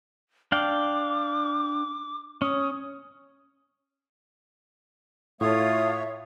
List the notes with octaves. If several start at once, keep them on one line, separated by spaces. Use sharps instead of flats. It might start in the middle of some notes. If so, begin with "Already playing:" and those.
D4 F5 G5 D6
C#4 D#6
A2 A3 F4 C#5 E5 F5 D#6